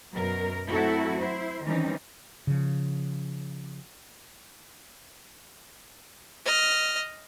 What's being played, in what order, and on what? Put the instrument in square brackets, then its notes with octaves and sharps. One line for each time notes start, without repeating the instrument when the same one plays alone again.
[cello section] F#2 B2 F#3 A#4
F#3 A3 C4 E4 F#4 A4
E4 C5
D#3 E3 G3 C4 C#4 D#4
[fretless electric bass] C#3 F3
[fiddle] D#5 F6